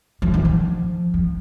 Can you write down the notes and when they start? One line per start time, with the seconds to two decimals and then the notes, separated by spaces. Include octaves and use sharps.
0.22 F3
0.34 D#3
0.45 F3
1.14 F3